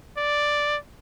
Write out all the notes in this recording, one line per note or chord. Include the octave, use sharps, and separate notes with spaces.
D5